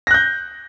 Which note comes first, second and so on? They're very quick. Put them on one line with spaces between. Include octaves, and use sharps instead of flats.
A#6 F#6 G6